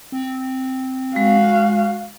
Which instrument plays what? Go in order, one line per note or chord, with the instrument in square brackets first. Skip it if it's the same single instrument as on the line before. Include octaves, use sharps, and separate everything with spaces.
[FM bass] C4
[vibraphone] G#3 [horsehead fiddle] F#4 F5